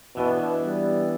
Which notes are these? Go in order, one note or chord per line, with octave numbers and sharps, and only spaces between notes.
B2 E3 B3 D4
G3